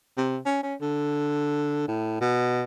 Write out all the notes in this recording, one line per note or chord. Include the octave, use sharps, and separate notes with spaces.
C3
C#4
C#4
D3
A2
B2